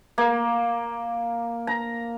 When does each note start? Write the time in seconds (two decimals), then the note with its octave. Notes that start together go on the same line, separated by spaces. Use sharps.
0.18 A#3
1.67 A#5